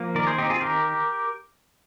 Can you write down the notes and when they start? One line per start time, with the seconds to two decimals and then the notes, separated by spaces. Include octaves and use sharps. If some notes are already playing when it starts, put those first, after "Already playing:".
Already playing: F3 A#3
0.15 D#3 A#4 D5
0.27 G#4 C5
0.38 C4 D#4 G4
0.50 F4 G#4
0.61 D#3 G4 A#4